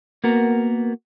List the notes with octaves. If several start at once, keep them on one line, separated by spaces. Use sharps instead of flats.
A#3 B3 F#4 A#4